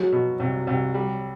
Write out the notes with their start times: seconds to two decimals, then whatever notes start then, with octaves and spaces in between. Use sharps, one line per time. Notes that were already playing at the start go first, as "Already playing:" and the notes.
Already playing: F#3 G#3
0.12 B2
0.40 C2
0.67 C2
0.94 G3